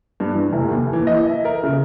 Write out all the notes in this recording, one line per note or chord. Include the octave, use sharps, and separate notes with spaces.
G2
E3
F1
D#2
E3
D#5
E5
A#4
C#3